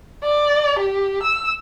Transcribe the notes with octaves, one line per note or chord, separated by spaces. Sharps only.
D5
G4
E6